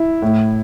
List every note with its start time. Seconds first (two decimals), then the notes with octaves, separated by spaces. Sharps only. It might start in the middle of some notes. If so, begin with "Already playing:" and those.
Already playing: E4
0.22 A2